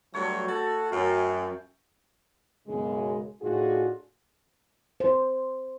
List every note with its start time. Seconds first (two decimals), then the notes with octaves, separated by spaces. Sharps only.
0.14 G2 F#3 A3 C#5
0.49 F#4 A4 A5
0.92 F#2 F5 G5
2.67 B1 F#2 C#3 G#3
3.42 A2 D4 D#4 F4 F#4 G#4
5.00 C5